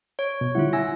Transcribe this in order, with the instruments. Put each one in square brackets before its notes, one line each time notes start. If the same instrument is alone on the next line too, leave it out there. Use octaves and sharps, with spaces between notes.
[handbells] C#5
[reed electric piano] B2
[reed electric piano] D3 G3 E4 [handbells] F4 F#5
[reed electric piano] E4 G#5 [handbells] E6 A#6